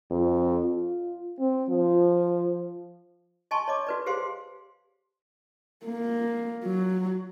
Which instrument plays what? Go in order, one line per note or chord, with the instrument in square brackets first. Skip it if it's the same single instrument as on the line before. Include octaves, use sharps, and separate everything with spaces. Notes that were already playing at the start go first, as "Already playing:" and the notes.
[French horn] F2
F4
C4
F3
[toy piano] D#5 G#5 A5 C6 C#6
C#5 D#5 D6
F#4 B4 D5
G4 G#4 C5 F5 C6
[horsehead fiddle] A#3
F#3